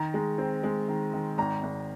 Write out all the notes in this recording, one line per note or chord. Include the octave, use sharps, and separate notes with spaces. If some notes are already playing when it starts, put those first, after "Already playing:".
Already playing: D#3 A#5
G#3
C4
G#3
D#3
D#3
G#1 A#5
G#1